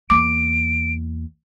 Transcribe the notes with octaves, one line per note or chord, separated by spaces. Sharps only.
E2 A#3 D6 D7